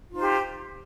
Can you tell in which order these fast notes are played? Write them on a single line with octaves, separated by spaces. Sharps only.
F4 D#4 C5 G4